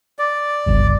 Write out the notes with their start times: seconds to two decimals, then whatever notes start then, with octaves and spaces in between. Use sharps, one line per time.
0.19 D5
0.66 G1 C#2 G2